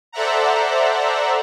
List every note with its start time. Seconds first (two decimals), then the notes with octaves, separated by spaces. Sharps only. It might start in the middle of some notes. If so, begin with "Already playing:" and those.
0.12 A4 C5 D5 E5 F#5 A#5